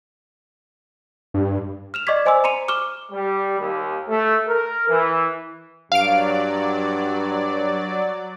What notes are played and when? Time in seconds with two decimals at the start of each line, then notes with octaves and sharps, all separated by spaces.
1.34 G2
1.94 F6 E7 F7
2.07 D5 D#5 C#6 D6 G#6 B6
2.26 C5 D#5 G#5 C6 D6 E6
2.44 A#5 C6 C#7 D#7 F7
2.68 C#6 D6 F6 E7 G7
3.11 G3
3.59 D#2
4.09 A3
4.48 A#4
4.89 E3
5.92 G2 F#3 D5 F5 D7